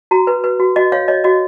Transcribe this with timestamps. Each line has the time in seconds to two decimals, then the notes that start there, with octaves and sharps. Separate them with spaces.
0.11 F#4 A#5
0.27 B4
0.44 B4
0.60 F#4
0.76 F#4 D#5
0.92 C#5 F5
1.08 C#5 D#5
1.24 F#4 D#5